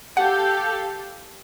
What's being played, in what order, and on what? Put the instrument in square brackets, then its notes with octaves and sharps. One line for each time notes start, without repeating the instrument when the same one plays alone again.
[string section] G4 A4 F5 [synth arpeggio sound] F#5